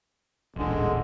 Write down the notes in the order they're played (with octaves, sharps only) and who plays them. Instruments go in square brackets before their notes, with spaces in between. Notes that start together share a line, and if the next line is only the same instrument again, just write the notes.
[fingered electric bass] D#1 A1 D4 [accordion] D3 G#3